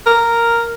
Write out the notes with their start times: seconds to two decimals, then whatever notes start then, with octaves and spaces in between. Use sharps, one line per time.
0.06 A#4